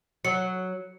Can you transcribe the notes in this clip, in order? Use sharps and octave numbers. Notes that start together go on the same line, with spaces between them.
F#3 C#7